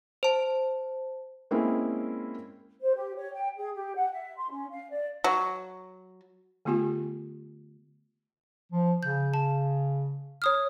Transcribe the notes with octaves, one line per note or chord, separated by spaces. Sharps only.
C5 A5
G#3 A#3 C4 C#4 E4
C5
G4
C#5
G5
G#4
G4
F#5
E5
C6
C#4
F5
D5
F#3
D3 A3 B3 F4 G4 G#5
F3
C#3 G6
A5
C#5 D#6 F6